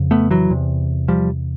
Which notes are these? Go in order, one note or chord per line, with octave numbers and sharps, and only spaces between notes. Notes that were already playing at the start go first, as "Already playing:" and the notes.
Already playing: F2 C#3
A3 B3
E3 F#3
E2 C3
F3 G3